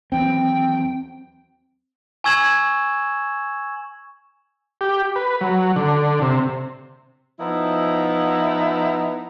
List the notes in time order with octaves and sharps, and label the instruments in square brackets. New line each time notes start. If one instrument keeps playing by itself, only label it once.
[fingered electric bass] D#2 E3 F#3 [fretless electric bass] C4 [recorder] G5
[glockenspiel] G#5 C#6 E6 G#6 E7 F#7
[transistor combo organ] G4
B4
F#3
D3
C3
[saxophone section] F3 B3 D#4 E4